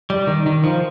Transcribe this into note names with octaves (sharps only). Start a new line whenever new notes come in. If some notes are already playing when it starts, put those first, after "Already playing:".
G3
D#3
D#3
F3